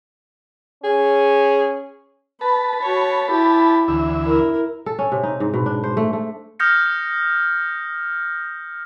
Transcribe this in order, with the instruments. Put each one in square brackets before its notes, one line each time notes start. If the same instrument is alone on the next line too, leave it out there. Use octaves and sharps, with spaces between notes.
[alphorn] C#4 [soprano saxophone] G#4
[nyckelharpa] B4 [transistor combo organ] A5 B5
[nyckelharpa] F#4 C#5
E4 G4
[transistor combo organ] D2 E3 E5
[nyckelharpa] E4 A#4
[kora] A4
C#4
C3
D#4
G#2
B2
D4
C5
A3
A3
[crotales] D#6 F6 G6 A#6 C#7